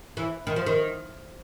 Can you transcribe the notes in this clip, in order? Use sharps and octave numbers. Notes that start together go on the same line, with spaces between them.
E3
D#3
F3
D#3